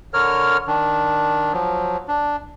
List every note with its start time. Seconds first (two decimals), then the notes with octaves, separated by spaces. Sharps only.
0.14 D3 A#4 C#5 F6
0.67 D#3 D4
1.53 F3 F#3
2.08 D4